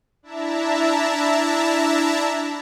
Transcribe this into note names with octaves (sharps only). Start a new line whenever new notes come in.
D4 E4 E5 A5 A#5